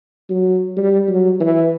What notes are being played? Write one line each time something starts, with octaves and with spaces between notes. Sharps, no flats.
F#3
G3
F#3
E3